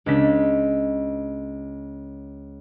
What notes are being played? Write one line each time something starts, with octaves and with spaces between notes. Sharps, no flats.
C#2 G#3 C#4 D4 B6